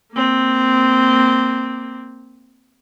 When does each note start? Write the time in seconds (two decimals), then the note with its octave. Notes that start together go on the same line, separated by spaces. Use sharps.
0.13 A#3 C4